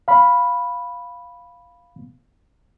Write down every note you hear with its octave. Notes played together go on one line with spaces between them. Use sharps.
F5 B5